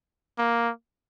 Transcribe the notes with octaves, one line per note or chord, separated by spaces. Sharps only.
A#3